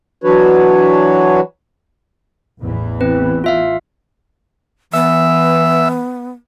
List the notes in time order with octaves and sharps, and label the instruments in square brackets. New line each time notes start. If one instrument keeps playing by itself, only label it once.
[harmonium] E3 F#3 D4 F#4 B4 C#5
[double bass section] A1 E2 E3
[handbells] C4 B4
F4 E5 F5
[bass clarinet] E3 [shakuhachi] B3 [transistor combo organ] E5